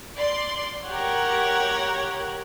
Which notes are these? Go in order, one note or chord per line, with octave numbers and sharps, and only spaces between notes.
D5 C6
G4 A#4 C#5 F#5